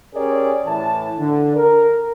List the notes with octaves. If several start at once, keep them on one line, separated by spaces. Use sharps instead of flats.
C#4 G4 G#4 A#4 C#5 D5
A2 E3 A5
D3
A#4